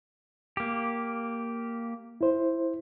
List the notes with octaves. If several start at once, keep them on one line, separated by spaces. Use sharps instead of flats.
A#3 G4
E4 C5